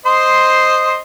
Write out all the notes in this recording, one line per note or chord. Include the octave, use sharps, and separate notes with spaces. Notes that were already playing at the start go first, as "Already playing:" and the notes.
C5 D#5 C6